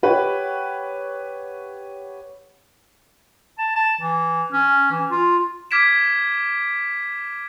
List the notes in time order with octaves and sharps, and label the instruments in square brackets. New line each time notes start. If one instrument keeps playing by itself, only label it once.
[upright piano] G4 B4 C#5 F#5 G5
[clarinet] A5
A5
E3
C#4
E3
F4
[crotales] D6 F6 G#6 B6 D7 E7